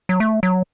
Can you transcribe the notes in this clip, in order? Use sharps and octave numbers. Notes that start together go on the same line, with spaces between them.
F#3
A3
F#3